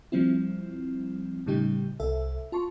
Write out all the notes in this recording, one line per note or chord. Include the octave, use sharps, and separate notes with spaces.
F3 G3 C4 E4
A2 C#3 G3 D#4 G4
C2 A4 E5
F4 A5 C6 C#6